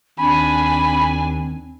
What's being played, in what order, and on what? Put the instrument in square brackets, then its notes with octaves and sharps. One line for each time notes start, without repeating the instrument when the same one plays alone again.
[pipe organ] D#2 [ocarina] C4 [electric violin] D4 G#5 [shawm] B5